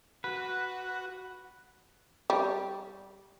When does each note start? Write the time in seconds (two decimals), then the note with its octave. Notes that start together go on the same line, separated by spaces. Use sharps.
0.24 F#4 B4
2.30 G3